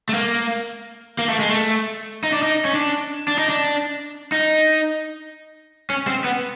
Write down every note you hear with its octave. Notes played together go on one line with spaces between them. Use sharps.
A3
A#3
A#3
A3
G#3
A3
D#4
D4
D#4
C#4
D4
D4
D#4
D4
D#4
C#4
C4
B3